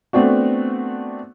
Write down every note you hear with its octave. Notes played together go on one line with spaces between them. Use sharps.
A3 B3 C4 D4 F#4